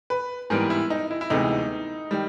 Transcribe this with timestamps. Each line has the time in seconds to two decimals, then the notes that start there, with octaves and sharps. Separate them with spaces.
0.10 B4
0.50 G#2 E3 G3 B3 A#4
0.70 E4
0.90 D#4
1.11 E4
1.21 E4
1.30 D2 C3 E3 G#3 B3 D#4
2.11 D#3 G3